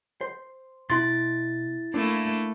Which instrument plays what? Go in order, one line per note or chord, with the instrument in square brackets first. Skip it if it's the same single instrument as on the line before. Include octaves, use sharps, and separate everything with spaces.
[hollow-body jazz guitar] C5
[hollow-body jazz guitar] B2 C6 [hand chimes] E4 A6
[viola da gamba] A3 A#3 E4 [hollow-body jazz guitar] D4